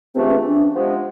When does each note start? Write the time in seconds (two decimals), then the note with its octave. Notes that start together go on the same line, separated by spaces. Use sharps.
0.15 C#2 C3 E3 A3 C4 D4
0.30 C#4
0.45 D4
0.75 C3 F3 G#3 B3